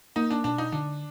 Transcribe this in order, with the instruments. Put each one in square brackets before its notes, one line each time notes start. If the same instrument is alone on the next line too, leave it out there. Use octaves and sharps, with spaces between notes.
[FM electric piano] A#3 [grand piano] D#4
[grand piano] D4
[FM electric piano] B2 [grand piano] D4
[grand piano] D#4
[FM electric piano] D3 [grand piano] D4